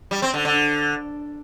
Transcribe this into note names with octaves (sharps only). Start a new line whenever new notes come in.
G3
C4
D3
D3